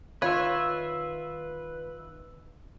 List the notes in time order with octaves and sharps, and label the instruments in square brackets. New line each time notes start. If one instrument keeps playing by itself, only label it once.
[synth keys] D#3 [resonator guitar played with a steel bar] F4 [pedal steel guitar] B4 E5 [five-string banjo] C#5